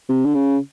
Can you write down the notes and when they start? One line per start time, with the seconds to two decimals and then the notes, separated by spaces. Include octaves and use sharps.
0.09 C3
0.25 D3
0.34 C#3